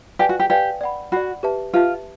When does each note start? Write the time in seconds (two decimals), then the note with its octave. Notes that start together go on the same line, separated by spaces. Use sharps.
0.19 G4 B4 D5 F5 G#5
0.29 F#4
0.40 G4
0.50 G4 B4 D5 F5 G#5
0.81 D5 F#5 B5
1.12 F#4 D5 F#5 B5
1.43 G4 B4 E5 A5
1.74 F4 G4 B4 E5 A5